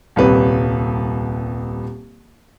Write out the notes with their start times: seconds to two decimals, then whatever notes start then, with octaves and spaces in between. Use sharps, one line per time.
0.16 D#1 C2 B4